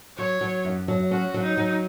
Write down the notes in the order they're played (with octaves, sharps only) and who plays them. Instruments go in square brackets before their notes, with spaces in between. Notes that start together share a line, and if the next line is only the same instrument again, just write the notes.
[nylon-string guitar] F#3 [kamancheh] C#5
[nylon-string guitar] F#3
F#2
F#3
[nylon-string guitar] C#4 [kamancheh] F#4
[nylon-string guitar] F#3
[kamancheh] D#4
[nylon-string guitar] F#3